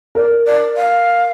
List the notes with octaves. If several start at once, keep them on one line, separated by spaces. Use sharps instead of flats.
A#4 D5
D5
F5